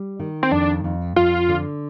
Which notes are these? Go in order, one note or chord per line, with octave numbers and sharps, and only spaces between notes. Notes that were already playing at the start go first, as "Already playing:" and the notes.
Already playing: G3
D#3
C4
F2 D4
F2
F2 F4
D3